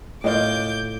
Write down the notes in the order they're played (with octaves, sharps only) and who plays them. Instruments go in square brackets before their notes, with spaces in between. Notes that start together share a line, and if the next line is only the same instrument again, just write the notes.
[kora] A2 F4 [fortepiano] D#5 [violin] D6 G6